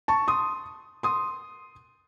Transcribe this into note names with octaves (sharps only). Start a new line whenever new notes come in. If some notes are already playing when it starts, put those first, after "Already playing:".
A5 C#6
C6 D#6
C6 D#6